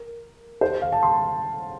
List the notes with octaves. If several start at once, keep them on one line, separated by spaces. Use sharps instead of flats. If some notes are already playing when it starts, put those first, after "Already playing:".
Already playing: A#4
C5
F5
A5
C6